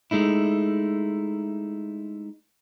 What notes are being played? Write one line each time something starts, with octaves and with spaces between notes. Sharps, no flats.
G#3 A3 D#4 E4